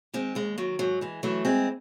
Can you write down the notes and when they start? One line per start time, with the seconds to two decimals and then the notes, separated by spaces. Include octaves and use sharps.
0.13 D#3 G#3 C4
0.35 D#2 G#3
0.58 D#3 F#3
0.79 G#2 F#3
1.01 E3 G#3
1.23 E3 F#3 A3
1.45 E3 G#3 C4